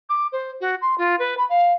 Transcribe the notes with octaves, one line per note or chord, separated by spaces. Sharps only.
D6
C5
F#4
C6
F4
B4
B5
F5